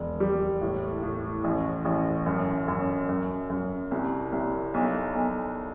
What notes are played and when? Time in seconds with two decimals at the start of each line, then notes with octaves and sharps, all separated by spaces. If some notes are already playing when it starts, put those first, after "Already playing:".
Already playing: E1
0.20 G3
0.61 A2
1.03 A2
1.44 A1
1.85 A1
2.26 F#2
2.68 F#2
3.09 F#2
3.50 F#2
3.91 C2
4.32 C2
4.74 B1
5.15 B1